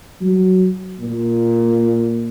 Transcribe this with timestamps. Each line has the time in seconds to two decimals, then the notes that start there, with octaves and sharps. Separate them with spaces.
0.21 F#3
0.99 A#2